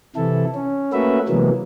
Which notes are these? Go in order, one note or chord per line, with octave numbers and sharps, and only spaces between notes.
C3 E3 E4 A4
C#4
A3 A#3 C#4 F#4 B4 E5
C3 E3 F#3 G#3 A#3 B3